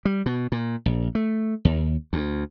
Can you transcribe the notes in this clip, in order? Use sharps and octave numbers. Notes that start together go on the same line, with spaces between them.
G3
B2
A#2
A#1
A3
D#2
D2